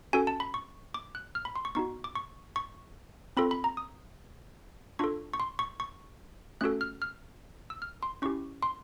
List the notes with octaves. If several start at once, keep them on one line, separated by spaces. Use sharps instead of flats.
C#4 F#4 A4 G#5
A5
B5
C#6
D6
F#6
F6
B5
C6
C#6
B3 D#4 F#4 C#6
D6
C#6
C#6
C4 F4 A4 B5
B5
A#5
D#6
D4 F4 A4 C#6
C#6
C6
C#6
C#6
A3 C#4 F#4 A4 F#6
F6
F6
E6
F6
C6
C#4 E4 G4 C#6
C6